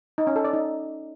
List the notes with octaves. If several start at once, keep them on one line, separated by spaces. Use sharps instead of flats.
D#4
C#4
A4
D5
D#4